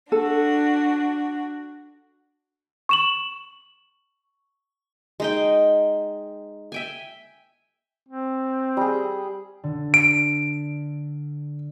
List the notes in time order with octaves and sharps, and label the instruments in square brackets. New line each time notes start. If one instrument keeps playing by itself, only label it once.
[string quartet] D4 F#4 [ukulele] A4
[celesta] C#6 E7 F#7
[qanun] G#3 D#4 G5
E5 G5 G#5
[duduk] C4
[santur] G3 G#4
[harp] D3
[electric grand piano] D7